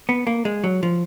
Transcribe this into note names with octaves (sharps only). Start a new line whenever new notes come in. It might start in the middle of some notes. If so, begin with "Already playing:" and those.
B3
A#3
G#3
F#3
F3